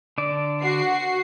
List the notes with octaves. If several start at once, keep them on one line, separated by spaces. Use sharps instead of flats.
D3 D5
F#4 C7